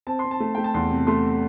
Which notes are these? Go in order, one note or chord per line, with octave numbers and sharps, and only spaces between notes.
C4 A5
C6
C4
A5
A3
A3 G5
A5
E2 C6
C3
A3 C6